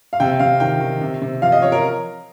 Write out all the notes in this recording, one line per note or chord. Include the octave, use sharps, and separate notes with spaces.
F5
C3 G5
C3 F5
D#3 G5
D#3
C3
C3
F3 F5
D#5
F3 C#5
A#4